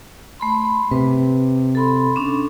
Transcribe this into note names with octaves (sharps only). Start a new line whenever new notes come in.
A3 B5 C6
C3 B4
A4 B5 C6
C#4 D4